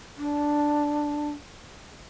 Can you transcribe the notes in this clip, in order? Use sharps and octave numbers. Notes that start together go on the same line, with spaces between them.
D4